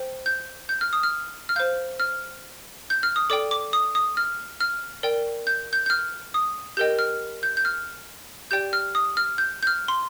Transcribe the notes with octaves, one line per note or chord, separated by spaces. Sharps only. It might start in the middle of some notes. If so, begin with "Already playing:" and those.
Already playing: C5 G5
G6
G6
F6
D#6
F6
F6
C5 F5 G6
F6
G6
F6
D#6
A4 D5 G5 D6
D6
D#6
D#6
F6
F6
A#4 D5 G5
G6
G6
G6
F6
D#6
G4 A#4 D#5 G5 G6
F6
G6
G6
F6
G4 D5 G5 G6
F6
D#6
F6
G6
G6
F6
C6